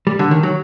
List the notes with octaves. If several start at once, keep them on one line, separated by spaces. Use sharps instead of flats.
G3
D3
D#3
F#3